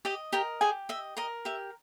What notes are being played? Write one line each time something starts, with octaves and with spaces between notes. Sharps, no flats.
G4 D#5 G5
G4 A#4 G5
G4 G#4 G#5
D#5 E5
A#4 D#5
G4 E5